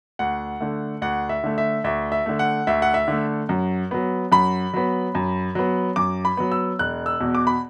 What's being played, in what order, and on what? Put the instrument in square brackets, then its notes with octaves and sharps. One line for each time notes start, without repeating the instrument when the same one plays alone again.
[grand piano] D2 F#5
D3 A3
D2 F#5
E5
D3 A3
E5
D2 E5
E5
D3 A3
F#5
D2 E5
F#5
E5
D3 A3
F#2
F#3 B3
F#2 B5
F#3 B3
F#2
F#3 B3
F#2 D6
B5
F#3 B3
E6
E1 F#6
E6
E2 B2
D6
B5